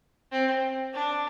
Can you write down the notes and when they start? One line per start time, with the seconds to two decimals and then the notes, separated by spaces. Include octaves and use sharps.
0.32 C4
0.93 D4